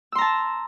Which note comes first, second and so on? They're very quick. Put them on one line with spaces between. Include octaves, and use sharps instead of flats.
E6 C6 A#5 A5